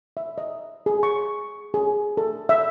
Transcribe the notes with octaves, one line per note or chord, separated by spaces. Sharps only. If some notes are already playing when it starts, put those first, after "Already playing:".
E5
D#5
G#4
C#6
G#4
A4
E5